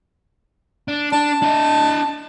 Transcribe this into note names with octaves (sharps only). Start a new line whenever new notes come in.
D4
D4 A5
D4 D#5